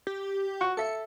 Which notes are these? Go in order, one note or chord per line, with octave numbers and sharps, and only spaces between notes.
G4
F#4 C#6
A4 E5 C#7